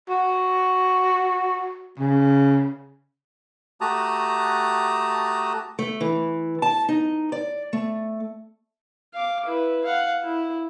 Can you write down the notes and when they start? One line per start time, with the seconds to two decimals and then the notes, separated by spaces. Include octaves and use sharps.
0.10 F#4
1.99 C#3
3.81 A3 F#4 G4 A5 A#5 D#6
5.79 A3
6.01 E3
6.62 A5
6.89 D#4
7.32 D5
7.73 A3
9.14 F5 D6
9.45 E4 B4
9.85 F5 F#5
10.24 E4